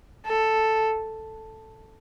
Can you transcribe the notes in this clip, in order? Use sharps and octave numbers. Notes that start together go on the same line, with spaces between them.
A4